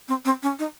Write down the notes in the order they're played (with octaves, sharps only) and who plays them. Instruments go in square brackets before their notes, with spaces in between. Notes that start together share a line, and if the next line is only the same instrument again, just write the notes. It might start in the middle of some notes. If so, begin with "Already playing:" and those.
[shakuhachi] C4
C4
C#4
D#4